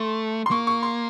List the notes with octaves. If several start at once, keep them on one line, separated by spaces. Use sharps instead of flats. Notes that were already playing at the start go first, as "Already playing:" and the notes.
Already playing: A3 C6
C6
A#3 C#6
C#6
C6